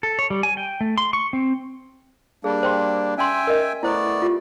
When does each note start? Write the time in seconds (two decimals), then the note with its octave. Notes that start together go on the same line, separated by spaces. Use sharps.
0.03 A4
0.19 C#5
0.30 G3
0.43 G#5
0.57 G5
0.81 A3
0.98 C6
1.13 C#6
1.33 C4
2.44 G3 A#3 D4 G#4
2.63 C5 G5 C6
3.18 C#4 E5 G5 G#5 C6
3.47 A#4 D#5
3.83 A3 B3 E4 C5 D5
4.22 F4 G4